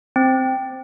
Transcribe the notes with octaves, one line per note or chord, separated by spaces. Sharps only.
C4